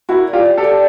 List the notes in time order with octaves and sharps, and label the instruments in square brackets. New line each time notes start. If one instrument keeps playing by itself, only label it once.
[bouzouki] A#3 [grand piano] E4 F#4
[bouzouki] G3
[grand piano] F4 G4
[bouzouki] D4
[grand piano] G4 A4
[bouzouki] D4